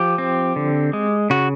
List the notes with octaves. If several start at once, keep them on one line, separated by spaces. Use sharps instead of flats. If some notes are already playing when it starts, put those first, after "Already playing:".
Already playing: F3 G4
C4
D3
G#3
C#3 F#4